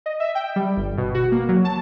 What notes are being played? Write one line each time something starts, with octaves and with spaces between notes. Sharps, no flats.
D#5
E5
G5
G3
G1
B2
F#4
A#3
F#3
A5